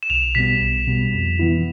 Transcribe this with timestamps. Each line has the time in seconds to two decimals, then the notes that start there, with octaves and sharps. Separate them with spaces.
0.03 E7
0.10 B1 F7
0.35 B2 G3 B3 B6
0.61 B1
0.87 B2 G3 B3
1.13 F2
1.39 E3 B3 E4